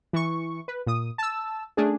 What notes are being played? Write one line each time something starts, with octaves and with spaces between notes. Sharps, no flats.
E3 C#6
B4
A#2 D#6
A5 E6
A3 C#4 D4 G#4